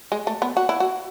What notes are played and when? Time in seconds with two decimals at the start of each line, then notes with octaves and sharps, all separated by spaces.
0.12 G#3
0.27 A3
0.42 B3
0.57 F#4
0.69 E4
0.80 F#4